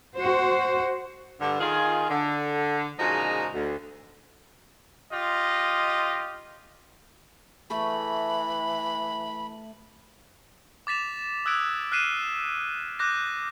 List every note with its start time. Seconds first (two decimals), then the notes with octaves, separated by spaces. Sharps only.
0.15 F#4 C5
1.40 G2 D3
1.60 D#3 F4 G#4
2.09 D3
2.99 A#2 C#3 F3 G#3 D#4 F#4
3.53 D2
5.12 F4 G4 D#5
7.70 E3 A3 A4 B5
10.87 D6 A6 B6 E7 F7
11.45 D#6 E6 F#6 G#6 B6 D7
11.92 F6 F#6 B6 C7 D#7 E7
12.99 D6 F#6 G6 A#6